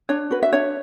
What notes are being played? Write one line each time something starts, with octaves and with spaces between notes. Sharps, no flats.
D4 C#5
F#4 B4
E5
D4 C#5